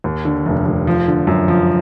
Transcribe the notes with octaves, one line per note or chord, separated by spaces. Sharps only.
D#2
D3
F1
F1
F3
D3
F#2
F3